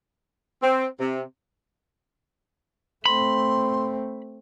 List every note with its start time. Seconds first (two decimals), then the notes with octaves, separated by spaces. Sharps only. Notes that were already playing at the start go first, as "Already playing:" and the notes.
0.62 C4
1.00 C3
3.06 A3 C4 B5 C6